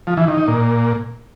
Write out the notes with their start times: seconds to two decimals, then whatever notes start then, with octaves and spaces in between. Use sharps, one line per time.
0.07 F3
0.17 E3
0.27 D#3
0.37 D#4
0.47 A#2